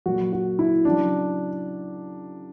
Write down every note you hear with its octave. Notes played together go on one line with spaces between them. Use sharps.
A#2 F#3 F#4
F#4
E4
C#3 F#3 D4